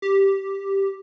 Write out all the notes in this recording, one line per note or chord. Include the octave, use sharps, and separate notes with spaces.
G4